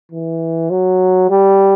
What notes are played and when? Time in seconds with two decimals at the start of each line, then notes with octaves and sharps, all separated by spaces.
0.12 E3
0.70 F#3
1.30 G3